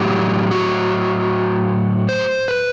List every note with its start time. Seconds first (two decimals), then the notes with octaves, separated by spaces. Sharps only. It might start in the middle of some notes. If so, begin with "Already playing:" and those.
Already playing: A2 F#3 G4
0.51 F#4
2.09 C5
2.48 B4